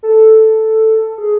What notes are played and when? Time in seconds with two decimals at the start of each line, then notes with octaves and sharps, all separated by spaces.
0.03 A4
1.18 G#4